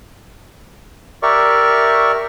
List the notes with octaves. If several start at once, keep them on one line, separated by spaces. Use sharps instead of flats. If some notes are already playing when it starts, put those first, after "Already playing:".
G4 A#4 D5 E5 C#6